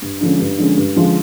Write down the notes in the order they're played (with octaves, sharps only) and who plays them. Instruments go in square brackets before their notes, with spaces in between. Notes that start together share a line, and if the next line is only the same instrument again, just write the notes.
[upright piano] G2
D3 F3 G#3 C#4
G2
D3 F3 G#3 C#4
G2
D3 F3 G#3 C#4